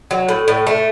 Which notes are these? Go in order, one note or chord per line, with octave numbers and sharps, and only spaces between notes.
F#3
A2
A2
A3